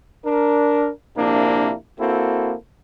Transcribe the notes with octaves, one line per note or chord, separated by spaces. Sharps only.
D4 A#4
A#1 C3 A#3 D4 E4
A#3 C4 E4 F#4 A4